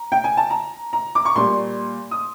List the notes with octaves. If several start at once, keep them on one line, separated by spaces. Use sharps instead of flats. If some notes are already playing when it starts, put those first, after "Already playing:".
Already playing: A#5
G5
G#5
A5
A#5
A#5
D6
C#6
A#2 G3 C6
D#6